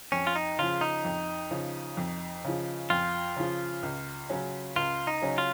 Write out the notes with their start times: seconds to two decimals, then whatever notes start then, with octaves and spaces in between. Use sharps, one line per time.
0.12 F2 C#4
0.27 F4
0.36 D#4
0.59 C#3 F3 F4
0.81 D#4
1.05 F2
1.51 C#3 F3
1.97 F2
2.45 C#3 F3
2.90 F2 F4
3.36 C#3 F3
3.83 C#2
4.29 C#3 F#3 C#4
4.76 C#2 F4
5.07 D#4
5.22 C#3 F#3 C#4
5.38 F4